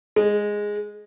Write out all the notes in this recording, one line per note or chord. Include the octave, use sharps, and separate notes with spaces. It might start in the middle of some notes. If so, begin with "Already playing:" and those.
G#3